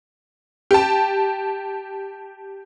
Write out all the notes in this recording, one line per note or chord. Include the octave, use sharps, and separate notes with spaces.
G4 A5